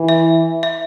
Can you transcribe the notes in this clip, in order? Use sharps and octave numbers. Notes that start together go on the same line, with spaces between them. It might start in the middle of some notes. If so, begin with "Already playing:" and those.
Already playing: E3
E5
E5